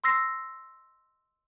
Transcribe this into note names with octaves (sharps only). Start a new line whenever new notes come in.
C6 E6 A#6 C7